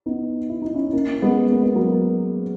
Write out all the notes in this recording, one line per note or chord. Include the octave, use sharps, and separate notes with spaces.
B3 D#4
E4
D#4
C#4 E4
A#3 C#4
G#3 B3
A#3
B3
F#3 A#3